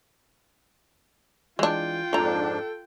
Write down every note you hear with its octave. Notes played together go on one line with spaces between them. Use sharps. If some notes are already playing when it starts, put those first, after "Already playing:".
E3 G#3 D4 F4 G5
F2 G#2 F3 D4 A4 A#5